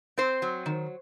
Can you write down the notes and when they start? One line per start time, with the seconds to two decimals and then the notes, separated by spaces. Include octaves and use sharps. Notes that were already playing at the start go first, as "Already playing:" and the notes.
0.18 C4 C5
0.42 F#3
0.66 D#3